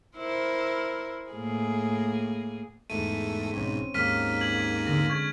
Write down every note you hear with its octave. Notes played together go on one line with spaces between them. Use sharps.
E4 A#4 C5
A2 A#3 G#4
E2 G#2 A3 D#7
B1 G#2 C4 C#4 C#5
D#2 G#2 A#3 F6 B6 D#7
G#6 F#7
D3 G#3 A#6
C#6 G#6